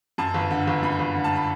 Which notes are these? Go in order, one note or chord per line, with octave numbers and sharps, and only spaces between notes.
F#2 A5
G1
D3
G1
F#2 B5
G1
D3
A5
B5